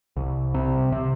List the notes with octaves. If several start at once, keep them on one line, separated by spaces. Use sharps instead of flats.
C2
C3
C3